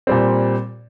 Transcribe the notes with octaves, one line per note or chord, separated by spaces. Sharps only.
A#2 G3 C4